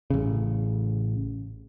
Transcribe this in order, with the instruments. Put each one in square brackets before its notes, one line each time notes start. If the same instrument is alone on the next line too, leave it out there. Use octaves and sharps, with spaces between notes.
[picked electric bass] A1 C#3